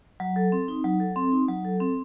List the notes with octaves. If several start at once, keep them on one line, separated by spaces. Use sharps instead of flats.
F#3
A4
C4
D#4
F#3
A4
C4
D#4
F#3
A4
C4